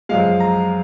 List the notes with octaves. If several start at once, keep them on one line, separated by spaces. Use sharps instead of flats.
F#2 F3 G#3 F5
A#5